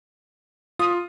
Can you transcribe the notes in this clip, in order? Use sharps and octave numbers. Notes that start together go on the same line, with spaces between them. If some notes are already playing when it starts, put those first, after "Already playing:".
F4 D#6